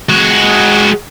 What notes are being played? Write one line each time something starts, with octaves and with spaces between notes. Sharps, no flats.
G#3 F#4